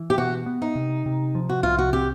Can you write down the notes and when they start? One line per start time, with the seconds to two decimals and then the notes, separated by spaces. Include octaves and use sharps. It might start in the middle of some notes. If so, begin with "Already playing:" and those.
Already playing: E3
0.10 G4
0.18 B2 F#4
0.46 B3
0.62 D#4
0.75 C3
1.06 C3
1.35 F3
1.49 F#4
1.63 C2 F4
1.79 F#4
1.93 C4 G4